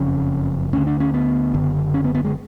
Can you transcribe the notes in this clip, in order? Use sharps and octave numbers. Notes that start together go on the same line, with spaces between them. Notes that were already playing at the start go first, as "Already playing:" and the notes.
Already playing: F#1 F2 C#3 C#4
D2 D3 C#4
D4
C#4
B3
F#1 F#2 D3
C#4
B3
B3
G#3